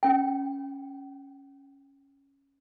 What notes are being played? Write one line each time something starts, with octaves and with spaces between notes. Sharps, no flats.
C#4 G5